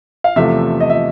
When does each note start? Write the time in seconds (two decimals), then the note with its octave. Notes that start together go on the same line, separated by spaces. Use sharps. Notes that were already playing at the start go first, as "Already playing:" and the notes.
0.24 F5
0.36 E2 C3 F3 A3 E5
0.81 D#5
0.90 E5